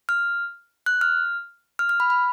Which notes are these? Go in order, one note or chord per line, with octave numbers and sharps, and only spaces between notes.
F6
F#6
F6
F6
F6
B5
B5